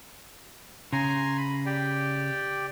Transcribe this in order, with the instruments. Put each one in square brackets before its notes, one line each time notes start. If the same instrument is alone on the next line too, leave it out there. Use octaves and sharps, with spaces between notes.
[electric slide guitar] C#3 [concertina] G#5 A#5 C6
[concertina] B5
G4 D5 G5